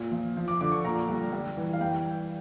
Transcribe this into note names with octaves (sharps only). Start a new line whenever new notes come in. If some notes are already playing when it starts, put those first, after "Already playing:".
Already playing: A#2
F3
F3
D6
D3 D6
C#6
A#2 A#5
G3
G3
E3
F5
G3 G5